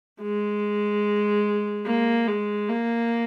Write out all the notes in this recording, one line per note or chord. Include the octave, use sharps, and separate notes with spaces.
G#3
A#3
G#3
A#3